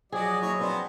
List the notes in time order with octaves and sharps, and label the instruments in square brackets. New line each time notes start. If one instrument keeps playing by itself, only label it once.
[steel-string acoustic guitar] F3 [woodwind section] F#3 D#5 [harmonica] F#4 D5 [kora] G#4
[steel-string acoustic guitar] D#2 E4 [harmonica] C#5
[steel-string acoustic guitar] F3 C4 D4 [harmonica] B3 C5